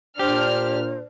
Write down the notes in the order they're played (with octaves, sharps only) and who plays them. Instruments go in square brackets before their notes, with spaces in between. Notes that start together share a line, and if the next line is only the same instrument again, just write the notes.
[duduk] A#2 [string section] D4 F6 [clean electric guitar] G4 [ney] C5